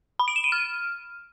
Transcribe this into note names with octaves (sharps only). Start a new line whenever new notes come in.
B5
D7
E7
D#7
F6